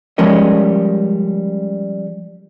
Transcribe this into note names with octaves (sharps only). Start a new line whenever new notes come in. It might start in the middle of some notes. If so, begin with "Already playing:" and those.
F3 G3 G#3 C#4 A#4 D#5